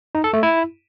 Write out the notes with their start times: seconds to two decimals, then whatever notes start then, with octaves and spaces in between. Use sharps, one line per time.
0.15 D#4
0.24 A4
0.33 A3
0.43 E4